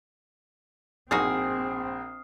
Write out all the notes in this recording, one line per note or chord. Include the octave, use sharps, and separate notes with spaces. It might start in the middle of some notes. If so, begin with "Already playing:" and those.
A#1 C4 D#4 F#4 G#4 D#6 F6 C7